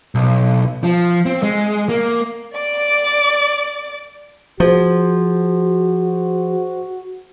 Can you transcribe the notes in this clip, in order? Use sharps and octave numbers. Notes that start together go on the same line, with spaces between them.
B1
F3
C4
G#3
A#3
D5 D6
F3 F#4 G#4 C5